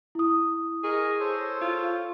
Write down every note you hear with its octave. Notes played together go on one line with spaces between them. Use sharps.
E4 D#6
G#4 A#4 D#5 C#6
A4 C5 C#5
F4